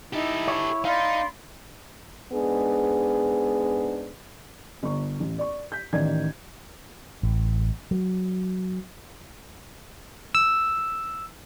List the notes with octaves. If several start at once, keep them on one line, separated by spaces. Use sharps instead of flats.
D#4 E4 G4 A4
C#5
D#4 D5 F5 B5 C6
G#2 G#3 B3 D4 G#4
G1 C#6
A1
D5 C#6
G6 B6
A1 D#3 D5 G#6
A1
F#3
E6